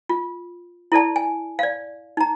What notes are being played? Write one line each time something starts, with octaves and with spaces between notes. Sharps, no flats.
F4
E4 A4 D5 A5
G#5
D5 F5
D#4 A#5